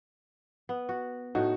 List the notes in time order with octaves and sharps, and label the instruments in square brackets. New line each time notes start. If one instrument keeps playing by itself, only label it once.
[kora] B3
F#4
[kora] A2 A3 [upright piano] D#4 F#4